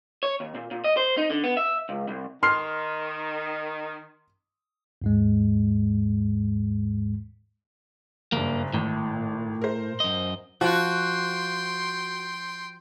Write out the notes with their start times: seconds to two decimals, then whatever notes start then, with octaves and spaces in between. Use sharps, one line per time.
0.23 C#5
0.40 D#2
0.55 A#2
0.71 A#2
0.84 D#5
0.97 C5
1.17 D#4
1.30 D3
1.43 B3
1.57 E5
1.89 C#2
2.08 C2
2.43 D#3 C6 F6 C7
5.02 D#2 G#2 G#3
8.32 F#1 G2 A#3
8.74 G#1 A2
9.61 A#4 C5
10.00 F#2 D#5
10.61 F3 F#4 G5 C6